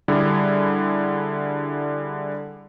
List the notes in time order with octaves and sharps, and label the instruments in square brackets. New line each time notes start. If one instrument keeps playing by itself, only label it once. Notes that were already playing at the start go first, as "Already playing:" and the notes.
[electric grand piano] D3 G3 E4 G#4